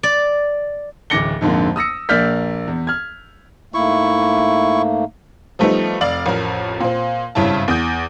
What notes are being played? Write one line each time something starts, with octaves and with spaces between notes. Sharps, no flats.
D5
D1 A1 D6 A#6 C#7 G7
A#1 F2 G#2 D3 A#3
D#6 E6 A#6 C#7
A#1 A#3 D5 F6 G6 B6
E2
F6 G#6
G#2 A3 A#3 E4 C#6
F3 G3 A3 B3 C4 D#4
F1 D5 F5 F#7
A1 F2 A#4
A#2 C4
G#1 G2 C#3 E4 A5
E2 D#6 G6